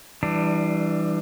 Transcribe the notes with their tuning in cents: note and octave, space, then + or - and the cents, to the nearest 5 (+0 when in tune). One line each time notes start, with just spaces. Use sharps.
E3 +0 G3 +0 D4 +25